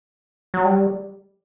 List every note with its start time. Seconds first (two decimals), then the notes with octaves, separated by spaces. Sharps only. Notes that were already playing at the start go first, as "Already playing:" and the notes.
0.54 F#3
0.65 G3